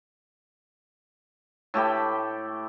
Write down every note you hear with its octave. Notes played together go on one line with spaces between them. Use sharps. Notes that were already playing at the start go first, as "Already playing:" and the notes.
A2 A3 G4 B5